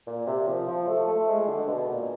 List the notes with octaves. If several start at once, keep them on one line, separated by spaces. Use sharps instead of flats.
A#2
C3
F3
F3
A3
A3
G#3
D3
B2
A#2